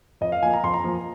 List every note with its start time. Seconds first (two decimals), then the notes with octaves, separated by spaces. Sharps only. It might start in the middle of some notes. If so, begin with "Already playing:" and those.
0.21 F2 D#5
0.32 F5
0.43 F3 A#3 G#5
0.53 A#5
0.63 F2 C6
0.74 A#5
0.84 F3 A#3